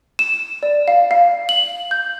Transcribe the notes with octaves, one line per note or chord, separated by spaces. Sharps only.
E7
D5
F5
F5
F#7
G6